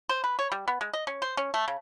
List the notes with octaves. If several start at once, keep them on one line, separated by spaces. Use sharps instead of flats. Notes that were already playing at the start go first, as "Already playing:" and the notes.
C5
B4
C#5
G3
B3
G#3
D#5
C#4
C5
C#4
A3
C#3